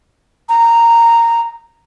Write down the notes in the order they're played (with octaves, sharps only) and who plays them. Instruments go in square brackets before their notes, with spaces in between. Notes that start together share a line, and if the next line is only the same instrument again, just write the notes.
[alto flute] A#5